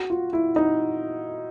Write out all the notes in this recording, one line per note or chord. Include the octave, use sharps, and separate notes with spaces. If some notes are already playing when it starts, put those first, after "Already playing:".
Already playing: F#4
F4
E4
D#4